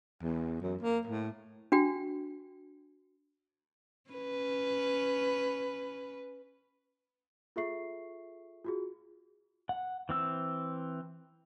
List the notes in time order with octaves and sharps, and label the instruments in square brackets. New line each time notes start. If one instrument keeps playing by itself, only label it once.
[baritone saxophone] E2
F#2
A#3
A2
[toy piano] D4 F#4 G5
[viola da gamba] C#4 B4
[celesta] F4 G#4 A4 E5 C#6 C7
F4 F#4 G#4
[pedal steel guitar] F#5
E3 C4 E6